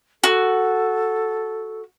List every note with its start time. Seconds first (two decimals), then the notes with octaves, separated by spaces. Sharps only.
0.24 F#4 A4